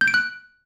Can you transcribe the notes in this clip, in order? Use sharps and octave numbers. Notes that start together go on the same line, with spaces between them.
G6
D7
F#6